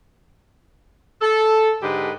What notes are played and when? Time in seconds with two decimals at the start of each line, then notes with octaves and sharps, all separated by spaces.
1.21 A4
1.82 G#2 D3 G#3 G4 B4